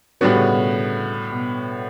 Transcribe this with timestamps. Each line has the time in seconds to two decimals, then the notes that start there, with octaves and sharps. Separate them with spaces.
0.21 A2 D3 G3 B3 F#4
0.35 C#3
0.50 B2
1.32 B2